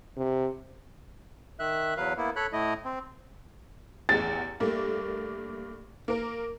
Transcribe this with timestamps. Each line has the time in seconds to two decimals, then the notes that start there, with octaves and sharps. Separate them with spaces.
0.17 C3
1.59 D#3 E5 F#6
1.97 E2 F#3 B4 F5
2.17 A#3 B3 E4
2.36 A4 C#5 B5 F#6
2.53 A2 A3 E4 D#5
2.85 C4
4.09 A1 E2 A6
4.60 G2 A3 A#3
6.08 A#3 A#4